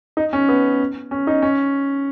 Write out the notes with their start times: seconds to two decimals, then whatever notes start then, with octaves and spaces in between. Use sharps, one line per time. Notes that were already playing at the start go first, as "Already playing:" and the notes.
0.17 D#4
0.33 C#4
0.49 B3
1.11 C#4
1.27 D#4
1.42 C#4